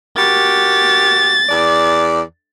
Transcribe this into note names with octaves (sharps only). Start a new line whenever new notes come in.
F#4 G4 A#4 A6
E2 D5